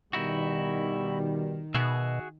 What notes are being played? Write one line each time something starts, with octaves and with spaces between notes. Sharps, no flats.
B2 D#3 G3 D#4 E4 F#4
B2 F#4 G#4 E5